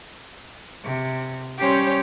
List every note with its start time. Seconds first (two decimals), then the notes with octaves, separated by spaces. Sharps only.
0.84 C3
1.58 G3 C#4 G4 C5 C#5